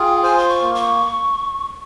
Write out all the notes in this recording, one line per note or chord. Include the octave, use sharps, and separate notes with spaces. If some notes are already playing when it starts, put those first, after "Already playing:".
Already playing: F4 G#4 G5
C5 G#5
C6
C#6
A#3
C#6